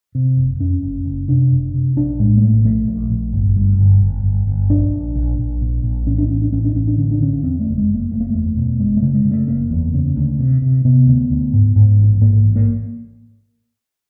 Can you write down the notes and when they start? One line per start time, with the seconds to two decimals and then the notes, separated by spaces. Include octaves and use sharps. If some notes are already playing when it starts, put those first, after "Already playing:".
0.15 C3
0.37 F#1
0.60 F2 C#4
0.83 F#1
1.05 F#1
1.28 C3 D4
1.51 F#1
1.74 C3
1.96 A#1 D4
2.19 A2 G#3
2.36 A#3
2.42 A#1 A3
2.65 A#1 A3
2.88 A#1
3.10 A#1
3.33 G1
3.56 G2
3.79 G1
4.01 G1
4.24 G1
4.47 G1
4.70 A#1 D4
4.93 A#1
5.15 A#1
5.38 A#1
5.61 A#2
5.84 A#1
6.06 A1 C#4
6.18 D4
6.29 A1 C#4
6.42 D4
6.52 A1 C#4
6.65 D4
6.75 A1 C#4
6.88 D4
6.98 D3 C#4
7.11 D4
7.20 D3 C#4
7.43 E2 C4
7.60 A3
7.66 F#1
7.77 G#3
7.89 F#1
7.94 A#3
8.11 F#1 A3
8.20 A#3
8.30 E2 A3
8.57 B2
8.80 F#1 G#3
8.97 A3
9.02 C#3
9.14 G#3
9.25 C#3
9.31 A3
9.48 F#1 A#3
9.70 E2
9.94 C#3
10.16 D2
10.39 C3
10.62 C3
10.85 C3 B3
11.07 D2
11.30 D2
11.53 G#2
11.76 G#2
11.98 A1
12.21 G#2 A#3
12.44 A1
12.56 A#3